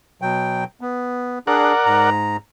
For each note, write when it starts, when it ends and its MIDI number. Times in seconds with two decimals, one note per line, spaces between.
0.22 0.64 47
0.22 0.64 54
0.22 0.64 79
0.81 1.39 59
1.47 1.73 62
1.47 1.73 68
1.47 2.10 70
1.47 2.10 74
1.47 2.10 78
1.86 2.37 44
1.86 2.37 82